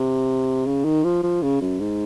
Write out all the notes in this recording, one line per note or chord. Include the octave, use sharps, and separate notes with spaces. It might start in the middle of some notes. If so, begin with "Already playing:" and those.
Already playing: C3
C#3
D#3
F3
F3
C#3
F#2
G#2